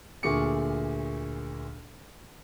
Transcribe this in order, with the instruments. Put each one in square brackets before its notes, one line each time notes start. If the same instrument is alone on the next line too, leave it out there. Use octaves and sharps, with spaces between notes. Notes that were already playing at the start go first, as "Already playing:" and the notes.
[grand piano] D2 A#2 G#4 C#6 D6 C#7